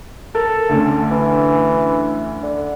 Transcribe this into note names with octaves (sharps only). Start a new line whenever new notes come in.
A4 A#4
D2 D3 C#4
E3
D3